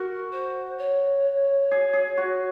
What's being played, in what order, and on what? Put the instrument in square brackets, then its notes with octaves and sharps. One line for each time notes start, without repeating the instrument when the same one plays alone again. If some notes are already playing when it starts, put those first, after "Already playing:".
Already playing: [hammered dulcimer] F#4 [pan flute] A#4
[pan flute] C5
C#5
[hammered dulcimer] G#4
G#4
F#4